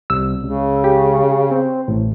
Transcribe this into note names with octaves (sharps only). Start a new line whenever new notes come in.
C2 E6
C#2 C#3
G4
C4
A1 A2